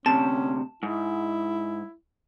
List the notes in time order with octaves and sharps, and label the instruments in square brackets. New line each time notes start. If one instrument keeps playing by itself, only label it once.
[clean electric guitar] D2 G2 C3 [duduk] C#4 [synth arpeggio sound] A5 E7
[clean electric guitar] G#2 [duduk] E4